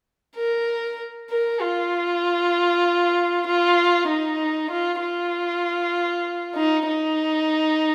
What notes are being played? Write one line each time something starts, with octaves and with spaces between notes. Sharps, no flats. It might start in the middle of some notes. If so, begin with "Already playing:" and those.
A#4
A#4
F4
F4
D#4
F4
F4
D#4
D#4